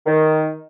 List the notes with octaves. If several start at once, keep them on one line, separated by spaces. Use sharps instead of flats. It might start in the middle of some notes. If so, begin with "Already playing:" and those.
D#3